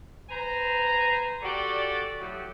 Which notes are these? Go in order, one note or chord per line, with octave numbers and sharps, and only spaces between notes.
B4 C5 G#5 A#5
F#4 G4 A4 D5
A2 F#3 G4